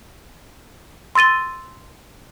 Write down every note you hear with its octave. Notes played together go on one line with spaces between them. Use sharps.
C6 E6 A6 D#7 G7